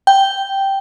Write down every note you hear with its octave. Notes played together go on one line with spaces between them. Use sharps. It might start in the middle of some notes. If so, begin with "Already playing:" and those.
G5